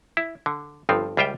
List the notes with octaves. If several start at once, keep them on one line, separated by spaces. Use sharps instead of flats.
E4
D3
G1 G2 F3 C4
C#2 G3 F4 E5 G5